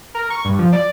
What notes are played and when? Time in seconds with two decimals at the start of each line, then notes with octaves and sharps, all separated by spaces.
0.15 A#4
0.30 C#6
0.45 G2
0.59 F3
0.72 D5